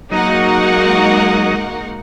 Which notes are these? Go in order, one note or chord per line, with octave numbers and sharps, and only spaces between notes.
F#3 G#3 A#3 D#4 F#4 A#4 D#5 F#5